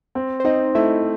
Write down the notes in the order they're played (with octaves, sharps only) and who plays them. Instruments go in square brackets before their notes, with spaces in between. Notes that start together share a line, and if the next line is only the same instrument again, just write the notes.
[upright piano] C4
[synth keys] C5
[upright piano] C4 [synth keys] D#4 D#5
[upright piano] A3 [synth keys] E4 E5